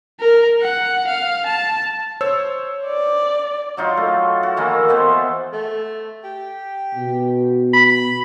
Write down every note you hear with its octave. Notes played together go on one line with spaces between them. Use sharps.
A#4
F#5
F5
A5
C5 C#5 E6
D5
F#3 D#4 F4
A3
F#4
D#3 E3 A#3
E3 B3 C5
A3
G4
B2
B5